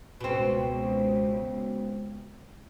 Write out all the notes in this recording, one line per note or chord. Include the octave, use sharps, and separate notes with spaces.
C#2 B2 C4